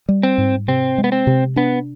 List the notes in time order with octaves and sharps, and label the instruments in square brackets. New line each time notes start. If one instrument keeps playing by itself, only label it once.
[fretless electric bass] G3
[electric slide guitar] C4
[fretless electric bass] G#2
[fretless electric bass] C3 [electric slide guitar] C4
[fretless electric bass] G#3
[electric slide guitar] B3
C4
[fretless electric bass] C3
[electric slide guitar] B3 [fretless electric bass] D4